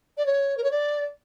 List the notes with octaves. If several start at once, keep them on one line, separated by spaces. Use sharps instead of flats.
D5
C#5
A#4
C#5
D5